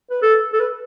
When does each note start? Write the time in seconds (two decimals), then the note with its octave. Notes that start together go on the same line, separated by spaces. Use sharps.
0.10 B4
0.22 A4
0.53 A4
0.60 B4